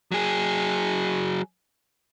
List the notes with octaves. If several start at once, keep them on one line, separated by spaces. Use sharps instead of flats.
F#3 G#4